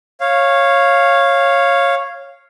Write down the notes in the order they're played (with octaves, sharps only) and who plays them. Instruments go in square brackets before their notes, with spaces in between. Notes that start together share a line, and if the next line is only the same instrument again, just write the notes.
[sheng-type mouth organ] C#5 F5